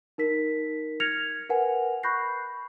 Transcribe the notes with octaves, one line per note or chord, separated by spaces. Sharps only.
D#4 A#4 B6
F6 G#6 A#6 C#7 F7
A#4 B4 F#5 G#5
B5 C#6 F#6 G6 A#6 C7